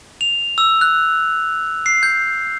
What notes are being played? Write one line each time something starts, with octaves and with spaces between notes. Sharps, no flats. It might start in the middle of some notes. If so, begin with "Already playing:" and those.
F7
E6
F#6
C7
G6